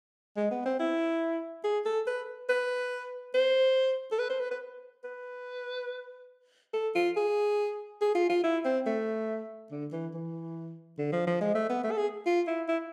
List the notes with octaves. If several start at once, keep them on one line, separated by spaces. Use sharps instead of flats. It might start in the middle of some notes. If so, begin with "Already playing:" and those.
G#3
B3
C4
E4
G#4
A4
B4
B4
C5
A4
B4
C5
B4
B4
B4
A4
F4
G#4
G#4
F4
F4
E4
C4
A3
D3
E3
E3
D3
F3
F3
G#3
A3
B3
A3
A4
G#4
F4
E4
E4